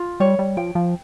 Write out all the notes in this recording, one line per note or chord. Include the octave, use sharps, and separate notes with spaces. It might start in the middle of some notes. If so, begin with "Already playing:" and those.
Already playing: F4
G3 C#5
G3
F3 G5
F3